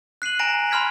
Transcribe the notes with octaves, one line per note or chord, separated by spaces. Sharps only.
F#6 C7 D#7 F#7
G#5 A#5 A#6 D7 F7
B5 C6 F6 G#6 B6